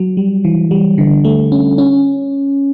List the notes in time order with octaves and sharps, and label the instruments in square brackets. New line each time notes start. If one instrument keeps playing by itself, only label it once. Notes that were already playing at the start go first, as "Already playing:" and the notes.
Already playing: [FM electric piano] F#3
G3
E3
G3
D3
A3
C#4
C#4